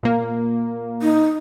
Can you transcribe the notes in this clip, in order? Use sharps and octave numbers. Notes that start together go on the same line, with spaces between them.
A#2 A#3
D#4